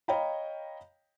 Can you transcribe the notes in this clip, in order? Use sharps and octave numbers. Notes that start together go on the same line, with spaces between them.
C#5 D#5 F5 G5 A#5 B5